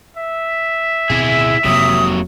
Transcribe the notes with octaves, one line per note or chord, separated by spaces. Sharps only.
E5
D1 B2 C4 E4 G#4
F1 C3 F#3 A#3 D#6